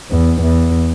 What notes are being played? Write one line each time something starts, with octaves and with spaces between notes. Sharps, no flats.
E2
E2